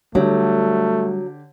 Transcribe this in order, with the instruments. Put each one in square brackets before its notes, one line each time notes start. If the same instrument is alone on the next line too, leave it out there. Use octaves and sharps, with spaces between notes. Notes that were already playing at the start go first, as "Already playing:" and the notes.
[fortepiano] D3 G4 [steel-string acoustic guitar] F#3 [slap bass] G3 [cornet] A3